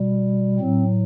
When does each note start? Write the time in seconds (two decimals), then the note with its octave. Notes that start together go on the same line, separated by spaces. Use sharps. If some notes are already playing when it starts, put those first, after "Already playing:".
Already playing: B2 G3
0.59 A2 F#3 C4